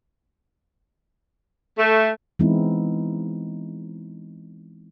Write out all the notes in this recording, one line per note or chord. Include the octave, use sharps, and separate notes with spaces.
A3
E3 G#3 B3 C4 D#4 E4